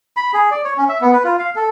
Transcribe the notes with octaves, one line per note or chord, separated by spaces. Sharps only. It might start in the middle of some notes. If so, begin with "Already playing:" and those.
B5
G#4
D5
C#5
C#4
E5
B3
B4
F4
F5
A4